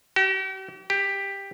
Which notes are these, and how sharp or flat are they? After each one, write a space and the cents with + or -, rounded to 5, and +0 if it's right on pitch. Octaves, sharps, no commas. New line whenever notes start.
G4 -45
G4 +10